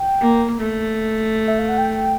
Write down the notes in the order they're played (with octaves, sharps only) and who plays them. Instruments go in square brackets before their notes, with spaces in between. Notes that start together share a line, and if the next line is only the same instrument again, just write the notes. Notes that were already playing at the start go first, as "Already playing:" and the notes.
Already playing: [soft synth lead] G5
[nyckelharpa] A#3
A3
[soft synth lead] E5
F5
F#5
G5